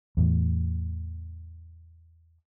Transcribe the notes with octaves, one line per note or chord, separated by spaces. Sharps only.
E2 A2 E3